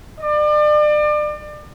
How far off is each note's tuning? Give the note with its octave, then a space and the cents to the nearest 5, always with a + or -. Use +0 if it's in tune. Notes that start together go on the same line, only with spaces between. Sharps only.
D5 +35